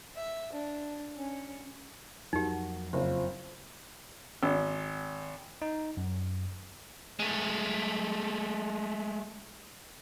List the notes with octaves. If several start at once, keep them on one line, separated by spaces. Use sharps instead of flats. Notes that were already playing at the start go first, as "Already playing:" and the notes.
E5
D4
C#4
F2 F#3 A#3 D#4 F#4 G4
F#1 C4 F4
G#1
D#4
F#2
G#3 A3